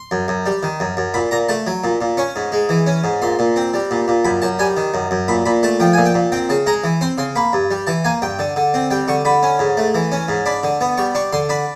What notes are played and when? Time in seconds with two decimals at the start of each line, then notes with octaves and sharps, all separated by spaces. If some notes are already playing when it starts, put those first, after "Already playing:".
Already playing: C6
0.11 F#2
0.28 F#2
0.46 G3
0.63 D#3
0.80 F#2
0.97 F#2
1.14 A#2 B5
1.31 A#2 A#5
1.49 A3 A5
1.67 F#3
1.84 A#2
2.01 A#2
2.17 C#4 C#6
2.36 G#2
2.52 G#3
2.69 E3
2.87 C#4
3.04 G#2
3.22 A#2 C6
3.39 A#2
3.56 C4
3.74 G3
3.91 A#2
4.08 A#2
4.25 F#2 B5
4.42 F#2 A5
4.59 G3 G#5
4.77 D#3
4.94 F#2
5.11 F#2
5.28 A#2 B5
5.46 A#2 B5
5.63 A3 A5
5.80 F3 G5
5.93 A#2 G#5
6.06 G5
6.14 A#2
6.32 C4 G5
6.49 C#3 A5
6.66 G#3 A#5
6.84 E3
7.01 C4 C6
7.18 C#3 C6
7.36 A#3 B5
7.53 G2
7.71 G3
7.87 E3 A5
8.05 A#3 G#5
8.22 G2 G5
8.39 D3
8.56 D3
8.74 C4
8.91 G3 G5
9.08 D3 C#6
9.25 D3 B5
9.43 C#4
9.59 G#2
9.77 A3
9.95 E3
10.12 C#4
10.28 G#2
10.46 D4 B5
10.63 D3
10.81 B3
10.97 G3 C#6
11.15 D4 C#6
11.33 D3 C6
11.49 D4 B5